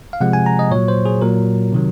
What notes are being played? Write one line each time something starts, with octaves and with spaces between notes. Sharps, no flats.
F5
C3 F3 G#3 F#5
G#5
A#5
D#5
A#2 F#3 C#5
C5
G#4
A#2 F#3 A#4
C3 D#3 F#3